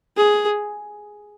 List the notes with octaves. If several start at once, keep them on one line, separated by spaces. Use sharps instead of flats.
G#4